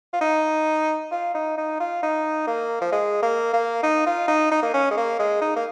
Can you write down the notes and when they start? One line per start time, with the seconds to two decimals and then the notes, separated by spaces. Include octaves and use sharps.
0.13 F4
0.21 D#4
1.11 F4
1.34 D#4
1.57 D#4
1.80 F4
2.03 D#4
2.47 A#3
2.81 F3
2.92 G#3
3.22 A#3
3.54 A#3
3.83 D#4
4.06 F4
4.28 D#4
4.51 D#4
4.63 A#3
4.74 C#4
4.91 G#3
4.97 A#3
5.19 G#3
5.41 D#4
5.56 A#3